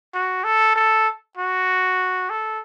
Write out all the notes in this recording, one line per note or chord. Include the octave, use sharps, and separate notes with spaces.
F#4
A4
A4
F#4
A4